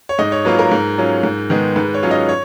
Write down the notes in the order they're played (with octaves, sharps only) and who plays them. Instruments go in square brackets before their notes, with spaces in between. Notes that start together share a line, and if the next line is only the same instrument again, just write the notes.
[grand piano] C#5
G#2 D#5
C#5
F#3 A#3 F4 B4
A#4
G#2
F#3 C#4 F4
G#2
D#3 G#3 B3
G#2 B4
C#5
F#3 C#4 F4
D#5
C#5